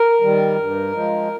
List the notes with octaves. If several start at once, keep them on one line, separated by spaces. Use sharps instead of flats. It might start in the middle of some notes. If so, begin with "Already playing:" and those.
Already playing: A#4
D#3 G3
G2
F3 G#3